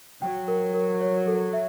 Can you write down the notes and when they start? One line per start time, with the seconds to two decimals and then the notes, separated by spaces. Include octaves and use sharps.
0.22 F#3 G5
0.48 A#4
0.74 A#4
1.01 C#5
1.27 A4
1.53 E5